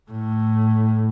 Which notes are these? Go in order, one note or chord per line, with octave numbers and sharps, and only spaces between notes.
A2